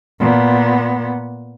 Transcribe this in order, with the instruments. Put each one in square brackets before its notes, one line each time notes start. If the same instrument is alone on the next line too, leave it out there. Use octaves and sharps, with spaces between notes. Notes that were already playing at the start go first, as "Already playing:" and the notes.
[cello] A#2 B3